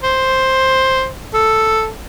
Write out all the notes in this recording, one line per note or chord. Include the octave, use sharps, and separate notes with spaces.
C5
A4